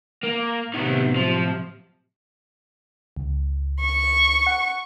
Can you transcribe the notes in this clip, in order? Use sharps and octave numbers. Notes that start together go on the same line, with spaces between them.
A#3
A2 C3 D#3 F#3 B3
F3
C#2
C#6
F#5